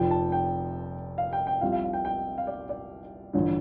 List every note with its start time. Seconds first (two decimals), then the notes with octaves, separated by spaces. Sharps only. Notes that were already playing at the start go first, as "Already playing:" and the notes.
Already playing: F1 F2 F3 G5
0.11 A5
0.32 G5
1.18 F5
1.33 G5
1.47 G5
1.61 C2 C3 F3 F5
1.72 F5
1.84 F5
1.93 G5
2.05 G5
2.38 F5
2.47 D5
2.69 D5
3.33 A1 G2 D3 F3